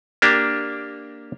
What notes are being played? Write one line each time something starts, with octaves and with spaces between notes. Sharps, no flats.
A#3 D4 G4